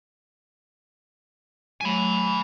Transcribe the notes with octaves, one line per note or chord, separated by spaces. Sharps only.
F#3 A3 G#5 B5